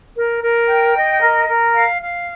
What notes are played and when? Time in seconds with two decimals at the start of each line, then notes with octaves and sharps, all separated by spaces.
0.14 A#4
0.41 A#4
0.67 G5
0.94 D#5
1.20 A#4
1.47 A#4
1.74 F5
2.00 F5